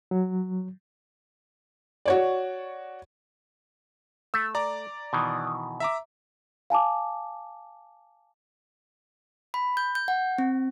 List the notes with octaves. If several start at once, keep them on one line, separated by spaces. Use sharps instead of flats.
F#3
F#4 C#5 D5
A3 E6
D5 A#5 D6
B2 D#3 E3
E5 A#5 D6
F5 G#5 A5 D6
B5
G6
G6
F#5
C4